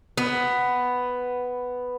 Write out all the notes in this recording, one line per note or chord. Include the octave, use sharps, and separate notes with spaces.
B3